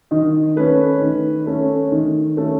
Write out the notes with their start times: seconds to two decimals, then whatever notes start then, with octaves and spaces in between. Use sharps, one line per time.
0.11 D#3 D#5
0.56 A3 C#4 B4
1.02 D#3
1.46 A3 C#4
1.92 D#3
2.37 A3 C#4